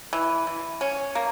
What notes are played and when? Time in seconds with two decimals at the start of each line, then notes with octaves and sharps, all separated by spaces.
0.13 E3
0.47 E3
0.81 C#4
1.15 A#3